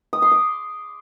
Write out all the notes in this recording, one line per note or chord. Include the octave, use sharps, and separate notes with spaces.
D#6
C6
D6